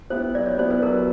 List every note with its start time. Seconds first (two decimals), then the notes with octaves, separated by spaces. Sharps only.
0.10 B3 E4 G4 C5
0.34 F#3 D5
0.46 C#5
0.58 B3 E4 G4 C5
0.71 B4
0.82 F#3 A#4